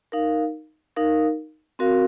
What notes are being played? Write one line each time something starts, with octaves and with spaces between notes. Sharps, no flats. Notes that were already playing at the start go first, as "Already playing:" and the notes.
D#4 A#4 F5
D#4 A#4 F5
C4 F#4 A#4 F5